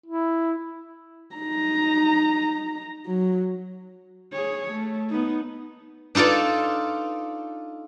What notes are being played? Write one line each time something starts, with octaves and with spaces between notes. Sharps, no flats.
E4
D#4 A#5
F#3
G#4 C#5
A3
B3 D#4
D4 D#4 F4 A4 D5